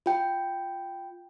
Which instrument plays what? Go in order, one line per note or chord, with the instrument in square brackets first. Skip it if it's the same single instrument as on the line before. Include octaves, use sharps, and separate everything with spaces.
[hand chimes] F4 G5